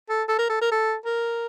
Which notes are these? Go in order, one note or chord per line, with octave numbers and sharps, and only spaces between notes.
A4
A4
A#4
A4
A#4
A4
A#4